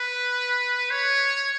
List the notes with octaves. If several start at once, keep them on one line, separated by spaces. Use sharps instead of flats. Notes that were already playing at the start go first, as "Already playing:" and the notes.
Already playing: B4
C#5